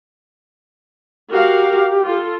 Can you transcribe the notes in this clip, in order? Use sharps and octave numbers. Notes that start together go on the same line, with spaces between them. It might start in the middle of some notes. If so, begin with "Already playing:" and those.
F#4 G4 A#4 F5
F4 A4